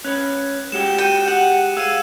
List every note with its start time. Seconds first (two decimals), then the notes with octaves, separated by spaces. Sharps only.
0.04 C#4 B4 F#6
0.72 G#3 F#4 G4 E7
0.98 G5 C#7 D#7
1.27 F#5 F#6
1.77 G#4 F5 E6 D#7